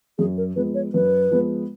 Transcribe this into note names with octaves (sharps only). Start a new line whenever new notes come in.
F#2 G#4
A#4
F3 G#3 B3 B4
C#5
F#2 B4
F3 G#3 B3